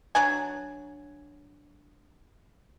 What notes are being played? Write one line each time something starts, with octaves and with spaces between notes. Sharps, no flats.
F#3 D4 G#5